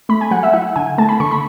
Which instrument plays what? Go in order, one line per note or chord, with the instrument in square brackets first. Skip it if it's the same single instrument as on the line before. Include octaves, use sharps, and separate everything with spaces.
[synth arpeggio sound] A3 B5
G#5
F#3 F#5
E5
E4 F#5
D3 G#5
A3 A5
B5
D3 C#6
B5